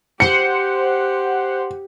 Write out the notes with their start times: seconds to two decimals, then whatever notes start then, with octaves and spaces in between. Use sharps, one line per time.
0.20 G4 C5 F#5 C#7